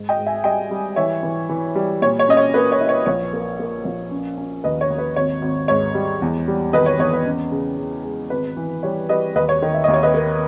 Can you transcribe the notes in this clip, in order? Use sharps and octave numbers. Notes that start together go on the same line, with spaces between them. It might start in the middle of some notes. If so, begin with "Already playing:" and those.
Already playing: G#2
D#5 G5
G#2
E5 G#5
G3 D#5 G5
G3
E3 C#5 E5
E3
E3
G3
A#2 C#5
C#5
C#4 D#5
C#5
A#3 B4
C#5
E4
C#5
A#1 C#5
A#3
A#3
A#1
C#4
C#4
D#2 B4 D#5
C#5
D#2
B4
G#1 C#5
G#1
G#2 C#5
G3
E2
G3
D#3 B4 D#5
C#5
E2 C#5
B4
C#4
C#3
C#3
G#3
G#1 B4
E3
G3 C#5
G3 B4 D#5
D#2 B4 D#5
C#5
D#3
E5
D#2 D#5
C#5
B4 D#5
A#3